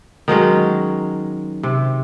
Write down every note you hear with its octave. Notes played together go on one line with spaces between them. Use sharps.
D#3 F#3 G#3 C#4
C3